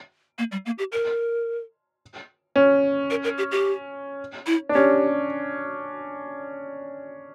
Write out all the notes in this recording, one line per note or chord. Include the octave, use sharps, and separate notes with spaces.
A#3
G3
A#3
G4
A#4
C#4
A#4
A#4
G4
G4
E4
D4
C#4 G4